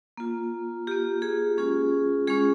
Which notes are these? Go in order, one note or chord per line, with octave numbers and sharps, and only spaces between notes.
A#3 F4
A#3 F4 G4
G#4
G#3 C#4 F4 G#4
G#3 C#4 F4 G#4